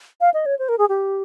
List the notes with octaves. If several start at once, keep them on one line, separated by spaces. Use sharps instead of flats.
F5
D#5
C#5
C5
A#4
G#4
G4